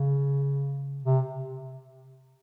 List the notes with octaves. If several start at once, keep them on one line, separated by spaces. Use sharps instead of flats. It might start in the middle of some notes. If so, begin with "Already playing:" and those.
Already playing: C#3
C3